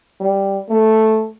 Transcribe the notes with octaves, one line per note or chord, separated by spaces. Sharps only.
G3
A3